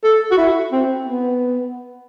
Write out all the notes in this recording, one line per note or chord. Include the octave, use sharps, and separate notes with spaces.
A4
F#4
E4
C4
B3